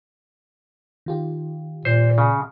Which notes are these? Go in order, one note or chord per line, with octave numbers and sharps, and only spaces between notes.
D#3 F4 G4
A#2 C5
C#3